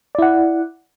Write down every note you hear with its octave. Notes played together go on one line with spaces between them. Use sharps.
E4 D5 F#5